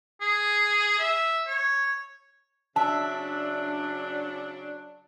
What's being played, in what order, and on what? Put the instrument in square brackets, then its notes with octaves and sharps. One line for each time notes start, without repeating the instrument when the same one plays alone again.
[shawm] G#4
E5
C#5
[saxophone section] C#3 F#3 D4 [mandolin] E5 [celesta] A5